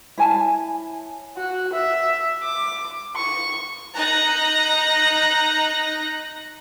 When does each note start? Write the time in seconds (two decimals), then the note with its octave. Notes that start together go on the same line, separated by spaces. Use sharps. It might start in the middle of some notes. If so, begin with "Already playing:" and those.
0.18 E4 C#5 G#5 A5
1.37 F#4
1.72 E5
2.43 D6
3.15 C#6
3.95 D#4 A#5 F#6 A#6